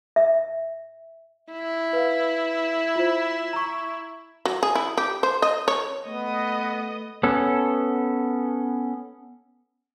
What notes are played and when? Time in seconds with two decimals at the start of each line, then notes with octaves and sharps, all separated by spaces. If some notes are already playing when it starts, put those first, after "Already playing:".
0.16 E5
1.52 E4
1.93 B4 F5
2.96 F4 C5
3.53 A#5 C#6
4.45 F#3
4.63 G#4
4.75 E4
4.97 G4
5.23 C5
5.42 D#5
5.68 C#5
6.06 A3 B3 D#5 D#6
7.23 B3 C#4 A4